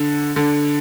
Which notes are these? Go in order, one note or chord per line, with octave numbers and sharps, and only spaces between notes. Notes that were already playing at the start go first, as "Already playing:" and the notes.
Already playing: D3
D3